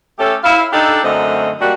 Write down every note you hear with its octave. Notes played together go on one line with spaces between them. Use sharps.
A3 C#4 G4 A4
E4 F5
D4 D#4 G4 A4
F#2 D3 A3 C4 D#5
G3 A#3 D4 F#4